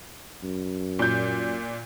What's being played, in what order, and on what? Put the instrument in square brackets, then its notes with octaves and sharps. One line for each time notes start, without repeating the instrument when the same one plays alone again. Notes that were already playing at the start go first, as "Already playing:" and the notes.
[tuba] F#2
[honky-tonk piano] A#2 G6